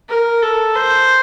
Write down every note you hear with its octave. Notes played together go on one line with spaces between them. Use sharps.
A#4
A4
C5